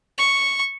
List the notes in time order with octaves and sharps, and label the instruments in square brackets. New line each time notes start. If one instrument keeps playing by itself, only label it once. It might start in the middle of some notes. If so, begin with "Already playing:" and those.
[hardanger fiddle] C#6